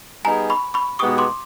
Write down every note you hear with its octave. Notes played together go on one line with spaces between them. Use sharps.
G3 B3 D#4 G#4 G#5 A#5
B5 C#6
B5 C#6
B2 G#3 B3 D#4 G4 C#6 D#6
C6 D6